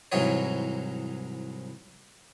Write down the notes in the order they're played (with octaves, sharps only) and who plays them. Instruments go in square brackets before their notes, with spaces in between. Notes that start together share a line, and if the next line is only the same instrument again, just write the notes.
[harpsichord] C2 G#2 E3 F#3 D#4 C#5